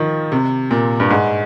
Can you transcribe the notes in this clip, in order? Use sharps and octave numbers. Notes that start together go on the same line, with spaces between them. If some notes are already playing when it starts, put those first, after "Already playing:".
Already playing: D#3 F3
C3
A#2
G2
G#2